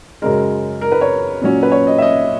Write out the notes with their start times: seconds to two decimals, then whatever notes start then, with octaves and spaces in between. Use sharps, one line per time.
0.22 F#2 C#3 G#3 A#4
0.81 A#4
0.92 B4
1.01 C#5
1.41 A#2 F#3 C#4
1.63 B4
1.72 C#5
1.87 D#5
1.98 E5
2.02 D#5